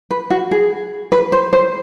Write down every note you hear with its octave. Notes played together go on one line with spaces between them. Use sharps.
B4
F#4
G#4
B4
C5
C5